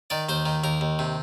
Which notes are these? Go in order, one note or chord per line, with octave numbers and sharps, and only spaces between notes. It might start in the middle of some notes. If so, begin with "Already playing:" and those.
D#3 D5
D#2 C5
D#3
D#2 A#4
D#2
C3